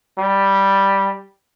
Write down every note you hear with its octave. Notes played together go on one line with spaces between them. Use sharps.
G3